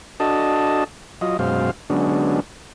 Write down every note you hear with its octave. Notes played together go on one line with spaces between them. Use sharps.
D4 F#4 A4 D#5 A5
F#3 F4 D#5
F#2 B2 G#3 C5 F5
D3 F#3 G#3 B3 C#4 D4